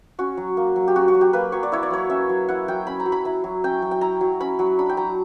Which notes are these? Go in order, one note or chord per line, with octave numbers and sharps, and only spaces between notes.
C#4 F#4
F#3
A#3
F#3
G4
C#4 F#4
F#4
F#3
G4
A#3 B4
F#3 C#5
D5
E4 C#5
D5
F#3 C#5
C#4 E5
F#3
E4 F#5
F#3 G5
C#4 B5
A#5
F#3
B5
E4 A#5
F#3
C#4 G5
F#3
G5
E4 A#5
F#3
C#4 B5
F#3
D4 B5
G5
F#3 A#5